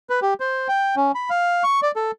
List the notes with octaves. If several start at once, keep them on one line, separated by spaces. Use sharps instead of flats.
B4
G4
C5
G5
C#4
B5
F5
C#6
D5
A4